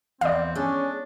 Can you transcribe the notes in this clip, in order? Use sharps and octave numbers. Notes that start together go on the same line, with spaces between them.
E2 C4 D5 F5
G#3 C#4 D4